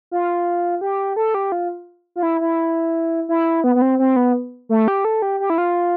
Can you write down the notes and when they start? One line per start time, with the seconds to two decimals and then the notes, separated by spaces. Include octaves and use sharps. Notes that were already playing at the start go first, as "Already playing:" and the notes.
0.11 F4
0.81 G4
1.16 A4
1.34 G4
1.52 F4
2.16 F4
2.23 E4
2.41 E4
3.29 E4
3.64 B3
3.75 B3
3.82 C4
3.99 C4
4.16 B3
4.69 A3
4.88 G4
5.05 A4
5.22 G4
5.40 G4
5.50 E4
5.58 F4